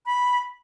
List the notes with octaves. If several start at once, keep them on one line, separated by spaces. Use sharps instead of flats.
B5